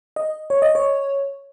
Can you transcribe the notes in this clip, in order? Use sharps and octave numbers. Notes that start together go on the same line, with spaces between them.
D#5
C#5
D#5
C#5